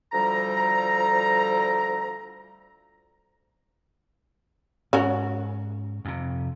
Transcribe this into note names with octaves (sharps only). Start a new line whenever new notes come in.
D2 F3 G3 A4 A#5
G#2 C#4 F#4 A#4
F2 C3